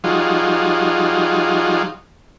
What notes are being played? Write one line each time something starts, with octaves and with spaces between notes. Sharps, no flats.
F3 G3 D#4 F4 F#4 G#4